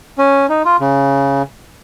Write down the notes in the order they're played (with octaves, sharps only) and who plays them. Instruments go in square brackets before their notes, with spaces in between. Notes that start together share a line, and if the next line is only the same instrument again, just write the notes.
[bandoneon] C#4
D#4
F4
C#3